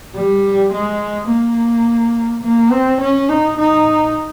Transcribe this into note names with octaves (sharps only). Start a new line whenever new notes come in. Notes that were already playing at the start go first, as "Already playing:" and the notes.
G3
G#3
A#3
A#3
C4
C#4
D#4
D#4